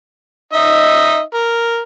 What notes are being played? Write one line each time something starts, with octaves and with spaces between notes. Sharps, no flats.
D#4 D#5 E5
A#4